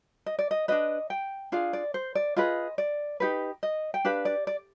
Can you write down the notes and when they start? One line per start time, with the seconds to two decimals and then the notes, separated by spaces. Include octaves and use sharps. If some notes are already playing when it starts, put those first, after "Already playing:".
0.26 D#5
0.39 D5
0.51 D#5
0.68 D4 F4 B4 D#5
1.10 G5
1.52 D4 F4 G#4 F5
1.73 D5
1.94 C5
2.15 D5
2.36 F4 G#4 B4 D#5
2.78 D5
3.20 D#4 G4 B4
3.63 D#5
3.94 G5
4.05 D4 G4 B4 F5
4.25 D5
4.47 D5